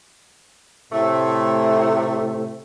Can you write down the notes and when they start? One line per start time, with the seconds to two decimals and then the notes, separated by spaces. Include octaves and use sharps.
0.92 A2 C3 A3